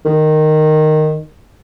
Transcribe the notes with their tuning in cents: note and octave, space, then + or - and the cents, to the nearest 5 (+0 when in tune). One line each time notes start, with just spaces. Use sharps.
D#3 -10